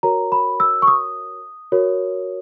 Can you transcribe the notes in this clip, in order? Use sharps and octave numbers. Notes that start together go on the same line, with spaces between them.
F#4 A#4 C#5 A#5
B5
E6
C#6
D#6
F#4 A#4 C#5